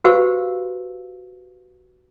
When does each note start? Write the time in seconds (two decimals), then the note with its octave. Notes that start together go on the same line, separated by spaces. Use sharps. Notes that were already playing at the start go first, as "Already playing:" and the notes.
0.04 F#4 G4 B4 C5 F5 E6